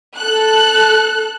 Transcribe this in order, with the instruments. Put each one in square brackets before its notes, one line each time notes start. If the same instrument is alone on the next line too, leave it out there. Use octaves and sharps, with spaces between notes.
[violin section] A4 F#6